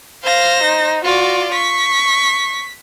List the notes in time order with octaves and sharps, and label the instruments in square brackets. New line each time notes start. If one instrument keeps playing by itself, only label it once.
[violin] C5 A#6 [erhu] F5
[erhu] D#4
[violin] F4 D5 [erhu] F#4
[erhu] C#6 [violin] B6